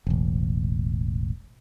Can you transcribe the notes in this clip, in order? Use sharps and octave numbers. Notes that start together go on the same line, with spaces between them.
E1 A1